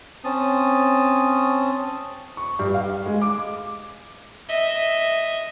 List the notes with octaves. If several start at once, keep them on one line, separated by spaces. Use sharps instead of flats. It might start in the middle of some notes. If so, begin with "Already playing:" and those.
C4 C#4 A5 D#6
C#6
G2
F5
G#3
D6
D#5 E5